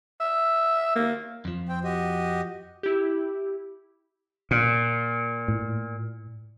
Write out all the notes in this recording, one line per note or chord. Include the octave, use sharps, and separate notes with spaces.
E5
A#3
F2 F3
C4 G5
F#4 G4 D#5
E4 G4
A#2
A2